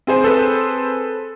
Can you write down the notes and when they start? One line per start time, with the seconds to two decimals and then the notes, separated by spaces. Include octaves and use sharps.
0.07 C4 G#4 C5
0.24 A4 B4